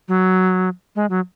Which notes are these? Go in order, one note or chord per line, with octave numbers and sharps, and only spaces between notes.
F#3
G#3
F#3